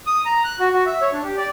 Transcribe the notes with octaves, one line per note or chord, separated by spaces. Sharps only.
D#6
A#5
F#6
F#4
F#4
E5
C#5
D4
G4
D5